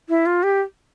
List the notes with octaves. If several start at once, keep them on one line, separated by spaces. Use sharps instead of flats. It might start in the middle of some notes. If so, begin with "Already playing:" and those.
E4
F4
G4